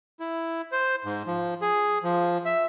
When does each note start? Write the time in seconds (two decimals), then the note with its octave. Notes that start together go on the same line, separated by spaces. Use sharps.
0.20 E4
0.72 C5
1.05 G#2
1.27 F3
1.62 G#4
2.03 F3
2.45 E5